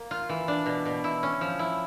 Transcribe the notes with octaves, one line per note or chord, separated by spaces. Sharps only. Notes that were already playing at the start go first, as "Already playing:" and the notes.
Already playing: A#3
F4
E3
D4
B2
B2
E4
C#4
F3
E4